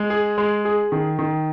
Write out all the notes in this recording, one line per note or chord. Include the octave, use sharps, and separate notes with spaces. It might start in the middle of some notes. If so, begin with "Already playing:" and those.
Already playing: G#3
G#4
G#3
G#4
D#3
D#3